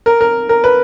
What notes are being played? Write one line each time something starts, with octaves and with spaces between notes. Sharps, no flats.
A#4
A#4
A#4
B4